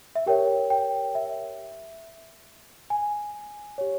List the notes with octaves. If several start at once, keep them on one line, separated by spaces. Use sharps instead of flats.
E5
G4 A#4 C#5 G5
G5
E5
G#5
G4 C#5